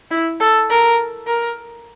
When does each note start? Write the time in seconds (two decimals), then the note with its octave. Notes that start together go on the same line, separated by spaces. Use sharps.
0.11 E4
0.40 A4
0.70 A#4
1.27 A#4